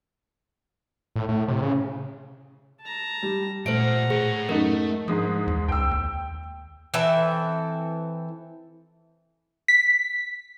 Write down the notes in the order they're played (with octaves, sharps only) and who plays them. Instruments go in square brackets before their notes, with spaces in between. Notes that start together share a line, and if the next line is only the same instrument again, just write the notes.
[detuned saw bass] A2
A2
C3
C#3
[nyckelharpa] A5 A#5
[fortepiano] G3
[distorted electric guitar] A#2 [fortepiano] A3 [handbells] C5 D7 [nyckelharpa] F#5 A#5
[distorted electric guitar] A2 [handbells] G#4
[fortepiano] F#2 D#4 [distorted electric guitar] A3 [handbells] A#4
[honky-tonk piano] G#2 G#3 D#6 [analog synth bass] F3
[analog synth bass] E2
[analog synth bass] C#2 [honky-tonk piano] G5 E6
[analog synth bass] D#2
[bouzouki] E3 C4 A4 E5
[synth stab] B6